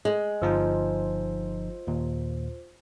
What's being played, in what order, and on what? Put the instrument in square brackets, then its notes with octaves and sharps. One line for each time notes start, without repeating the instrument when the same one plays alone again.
[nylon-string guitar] G#3
[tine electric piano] G1 F3 D#4 [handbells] F4 C5 E6
[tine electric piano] D#2 A#2